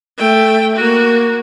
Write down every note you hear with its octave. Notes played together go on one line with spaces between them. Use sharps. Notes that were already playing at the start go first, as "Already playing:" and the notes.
A3 G5
A#3 F#4